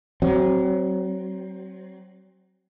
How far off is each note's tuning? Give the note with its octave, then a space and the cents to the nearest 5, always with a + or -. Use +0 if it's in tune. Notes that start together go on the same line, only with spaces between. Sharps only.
F#3 +30 C4 +15